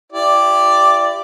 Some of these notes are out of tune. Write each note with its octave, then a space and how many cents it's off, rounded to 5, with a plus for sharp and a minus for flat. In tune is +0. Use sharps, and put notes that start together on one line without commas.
E4 +40 G4 +0 D5 +0